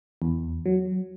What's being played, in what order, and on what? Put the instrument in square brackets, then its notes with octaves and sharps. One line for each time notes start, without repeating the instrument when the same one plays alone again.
[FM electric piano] E2
F#3